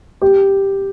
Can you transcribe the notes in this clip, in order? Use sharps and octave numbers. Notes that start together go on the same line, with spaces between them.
G4